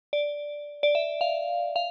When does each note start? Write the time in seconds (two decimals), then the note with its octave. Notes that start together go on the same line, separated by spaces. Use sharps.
0.13 D5
0.83 D5
0.95 E5
1.21 F5
1.76 F5